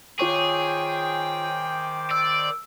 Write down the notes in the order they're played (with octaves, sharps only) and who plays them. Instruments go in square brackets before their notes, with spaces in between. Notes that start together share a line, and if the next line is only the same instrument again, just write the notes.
[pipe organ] D#3 C5 D6 [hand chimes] F4 C#5 C#6 [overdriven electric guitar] G#4 [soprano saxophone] G5
[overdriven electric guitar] D5 [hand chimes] E6